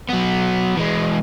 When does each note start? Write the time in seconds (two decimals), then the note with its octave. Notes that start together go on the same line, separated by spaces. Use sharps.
0.09 F#3 B3
0.77 E3 G#3